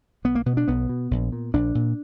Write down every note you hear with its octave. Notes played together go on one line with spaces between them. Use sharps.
B1 B3
A#3
B2 B3
D4
B1 B3
B2
A#1
A#2
A#1 D4
A#2